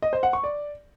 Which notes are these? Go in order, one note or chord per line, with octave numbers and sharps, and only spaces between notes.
D#5
C5
F#5
C#6
D5